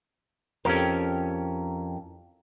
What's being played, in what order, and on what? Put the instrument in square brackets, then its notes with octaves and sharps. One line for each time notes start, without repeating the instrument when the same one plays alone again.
[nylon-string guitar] F2 [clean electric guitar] C#4 G4 A#4